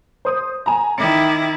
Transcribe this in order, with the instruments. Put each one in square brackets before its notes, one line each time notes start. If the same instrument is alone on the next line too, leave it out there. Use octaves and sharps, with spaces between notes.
[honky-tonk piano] C5 D#6
G#5 A#5
[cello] D#3 E4 [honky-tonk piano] D6 C#7